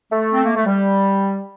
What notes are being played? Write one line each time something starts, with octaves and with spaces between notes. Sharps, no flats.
A3
C4
A#3
A3
G3